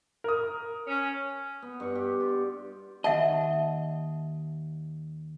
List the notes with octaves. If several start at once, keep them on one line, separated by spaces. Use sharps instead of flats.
A#4 D#6
C#4
B3
G2 C#6
G4
F4
D#2 D#5 E5 F#5 A5